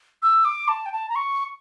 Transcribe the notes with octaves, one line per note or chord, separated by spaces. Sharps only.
E6
D6
A5
G5
A5
A#5
C#6